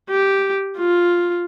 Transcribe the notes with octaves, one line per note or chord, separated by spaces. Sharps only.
G4
F4